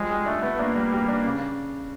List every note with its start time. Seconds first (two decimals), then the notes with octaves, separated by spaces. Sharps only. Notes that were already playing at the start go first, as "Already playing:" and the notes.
Already playing: F3 G3 G#3
0.10 G3
0.26 A3 D4
0.42 B3
0.58 A#3 D4
0.76 G3
0.92 G3
1.08 D4
1.24 C#3